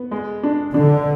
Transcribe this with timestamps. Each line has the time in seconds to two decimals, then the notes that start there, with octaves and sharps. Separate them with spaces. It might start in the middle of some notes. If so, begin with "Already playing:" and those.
Already playing: B3
0.11 G#3
0.43 D4
0.74 D3 D4